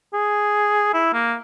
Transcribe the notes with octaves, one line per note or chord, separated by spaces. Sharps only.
G#4
E4
A#3